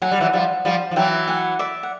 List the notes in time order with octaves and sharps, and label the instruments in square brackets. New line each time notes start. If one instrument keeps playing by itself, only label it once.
[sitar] F#3 [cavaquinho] F#5 G#5
[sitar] G3
E3 F#3
F3 G3
F3 G3
F3
[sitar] E3 F#3 [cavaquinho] G5 A5
[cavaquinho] F#5 G#5
D5 E5
F#5